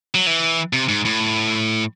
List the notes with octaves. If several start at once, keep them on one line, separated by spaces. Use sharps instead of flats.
F#3
E3
C3
G#2
A2